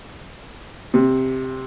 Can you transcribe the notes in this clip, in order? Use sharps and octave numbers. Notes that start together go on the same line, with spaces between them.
C3